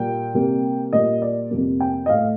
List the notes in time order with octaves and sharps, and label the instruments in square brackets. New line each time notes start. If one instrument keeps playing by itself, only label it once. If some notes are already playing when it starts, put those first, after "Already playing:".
Already playing: [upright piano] A#2 G3 A#3 G5
C3 G3 A#3
A#2 G3 A#3 D#5
D5
F2 C3 G3 A#3
G5
D#5
A2 A3 F5